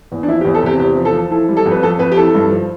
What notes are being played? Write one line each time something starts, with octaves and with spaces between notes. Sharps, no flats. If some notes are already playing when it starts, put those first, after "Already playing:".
E2
D4
F3 E4
G4
E2
A4
C3 G4
E2 G4
F3
A4
F3
E3 A4
G3
A4
F2
B4
F2 A4
F2 B4
G4
E3 A4
G2
F3